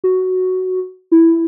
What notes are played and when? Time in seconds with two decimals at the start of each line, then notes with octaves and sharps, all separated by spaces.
0.04 F#4
1.12 E4